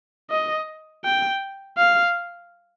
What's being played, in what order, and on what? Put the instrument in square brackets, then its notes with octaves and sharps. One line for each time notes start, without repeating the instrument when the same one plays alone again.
[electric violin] D#5
G5
F5